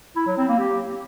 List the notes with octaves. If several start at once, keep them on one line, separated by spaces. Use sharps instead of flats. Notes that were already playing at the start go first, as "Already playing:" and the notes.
E4
F#3
C4
A#3
G4